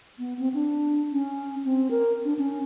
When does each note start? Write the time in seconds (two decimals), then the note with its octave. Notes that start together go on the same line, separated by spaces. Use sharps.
0.19 B3
0.39 C4
0.54 D4
1.12 C#4
1.65 C4
1.91 A#4
2.25 D4
2.39 C#4